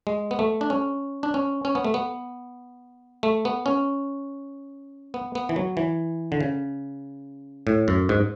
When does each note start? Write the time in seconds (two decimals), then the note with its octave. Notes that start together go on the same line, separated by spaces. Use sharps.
0.07 G#3
0.31 B3
0.39 A3
0.61 D4
0.70 C#4
1.23 D4
1.34 C#4
1.65 C#4
1.75 B3
1.85 A3
1.94 B3
3.23 A3
3.45 B3
3.66 C#4
5.14 B3
5.35 B3
5.49 E3
5.56 F#3
5.77 E3
6.32 D3
6.40 C#3
7.67 A2
7.88 F#2
8.09 G#2